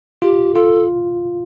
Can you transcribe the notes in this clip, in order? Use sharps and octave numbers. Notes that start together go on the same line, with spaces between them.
F4 G4
F4 A4